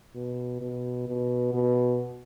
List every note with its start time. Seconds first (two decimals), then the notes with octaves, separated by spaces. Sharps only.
0.15 B2
0.61 B2
1.08 B2
1.54 B2